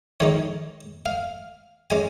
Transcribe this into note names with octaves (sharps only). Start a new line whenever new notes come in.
D#3 G#3 D#4 C#5
F5
G#3 C#4 G#5